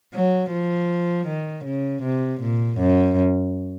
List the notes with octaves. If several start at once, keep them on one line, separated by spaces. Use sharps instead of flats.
F#3
F3
D#3
C#3
C3
A#2
F#2